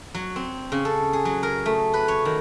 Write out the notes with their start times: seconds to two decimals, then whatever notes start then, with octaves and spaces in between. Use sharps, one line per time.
0.15 F#3
0.36 C4
0.72 C#3
0.85 A4
1.13 G#4
1.25 F#3
1.43 A#4
1.66 A3
1.94 B4
2.08 C#5
2.25 D#3